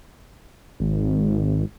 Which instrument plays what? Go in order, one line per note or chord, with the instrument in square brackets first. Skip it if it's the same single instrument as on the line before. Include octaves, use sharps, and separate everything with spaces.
[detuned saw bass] G#1